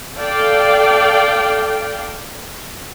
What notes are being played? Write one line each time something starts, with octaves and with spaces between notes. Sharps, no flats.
A4 D5 F5 G5